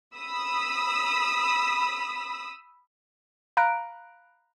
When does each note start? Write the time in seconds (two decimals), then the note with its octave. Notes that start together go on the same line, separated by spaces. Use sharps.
0.17 B5 D#6 E6 B6
3.57 F5 A#5 B5 F#6 D7